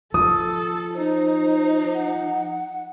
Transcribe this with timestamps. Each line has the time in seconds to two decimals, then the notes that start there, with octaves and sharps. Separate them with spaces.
0.14 F3 A4 D#6
0.95 D#4 C5
1.94 F#5